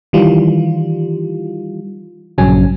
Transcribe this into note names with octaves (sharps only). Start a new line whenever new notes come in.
D#3 E3 G3 F4
A#1 G2 C#3 F#3 C#4 G#5